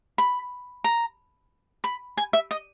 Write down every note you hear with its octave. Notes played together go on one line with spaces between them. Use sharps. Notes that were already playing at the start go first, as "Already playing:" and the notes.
B5
A#5
B5
G#5
E5
D#5